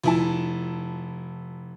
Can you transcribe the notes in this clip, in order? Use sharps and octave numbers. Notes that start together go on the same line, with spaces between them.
F1 E4 A5